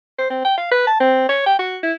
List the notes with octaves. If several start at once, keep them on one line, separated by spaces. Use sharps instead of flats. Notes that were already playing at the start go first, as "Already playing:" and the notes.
C5
C4
G5
F5
B4
A5
C4
C#5
G5
F#4
E4